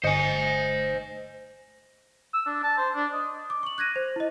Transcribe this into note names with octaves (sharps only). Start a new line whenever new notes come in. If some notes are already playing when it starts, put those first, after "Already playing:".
G1 C5 D#5 G#5 C#7
E6
D4
A5
C5
D4
D#5
D6
C#6 F#7
F#6 G#6 A#6 D#7
C5
E4 D#5